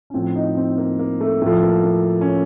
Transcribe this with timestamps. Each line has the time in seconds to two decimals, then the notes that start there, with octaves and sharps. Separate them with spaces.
0.10 C#4
0.14 A2 F3 C4
0.36 D#4
0.57 C4
0.78 A#3
0.99 A#3
1.21 A3
1.42 A2 F3 A3
1.63 A#3
1.84 A#3
2.21 C#4